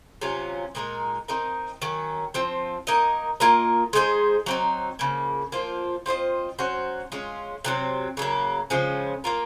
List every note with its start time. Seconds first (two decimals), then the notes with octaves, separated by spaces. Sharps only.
0.21 C3 F#3 C#4 F4
0.75 A#2 G#3 D#4 A#4
1.28 C4 D#4 A#4 D#5
1.82 D#3 F#3 C#4
2.34 F3 C4 F4
2.87 A#3 D#4 A#4 D#5
3.40 A#3 F4 A#4 D#5
3.93 G#3 D#4 G#4 C5
4.46 F#3 C4 D#4
4.99 C#3 F3 A#3
5.52 F3 A#3 F4 C5
6.06 C4 F4 C5 D#5
6.59 F#3 C#4 F#4 C5
7.12 G#3 C#4 F4
7.65 C3 F#3 C4
8.17 C#3 F#3 A#3
8.70 C#3 F3 G#3 C#4
9.24 A#3 F4 A#4